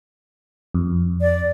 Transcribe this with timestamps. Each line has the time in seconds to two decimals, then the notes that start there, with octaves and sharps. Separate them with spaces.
0.74 F2
1.21 D5